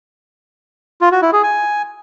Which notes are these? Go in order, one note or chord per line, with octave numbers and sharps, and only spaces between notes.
F4
F#4
E4
G#4
G#5